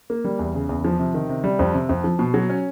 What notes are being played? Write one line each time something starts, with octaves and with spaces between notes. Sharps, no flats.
A#3
G3
E2
C#3
E2
F3
C3
D#3
C3
G3
F2
C3
F2
F3
B2
F#3
C#4